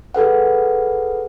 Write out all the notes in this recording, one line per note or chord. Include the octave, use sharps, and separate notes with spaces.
G#4 A4 B4 F#5